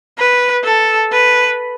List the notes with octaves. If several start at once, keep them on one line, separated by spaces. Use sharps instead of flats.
B4
A4
B4